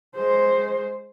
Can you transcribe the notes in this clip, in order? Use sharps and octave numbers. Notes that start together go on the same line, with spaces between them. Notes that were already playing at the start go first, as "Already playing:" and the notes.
G#3 C5